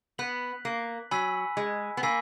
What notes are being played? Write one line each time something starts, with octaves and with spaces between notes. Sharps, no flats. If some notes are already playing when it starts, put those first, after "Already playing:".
B3 F#6 B6 F#7
A#3
F#3 G#5 B5 E6 B6
G#3
B3
A#3 G#5 B5 E6 B6